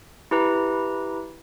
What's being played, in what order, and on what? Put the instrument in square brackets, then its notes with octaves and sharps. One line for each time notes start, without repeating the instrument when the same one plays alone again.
[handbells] E4 G4 B4 A#5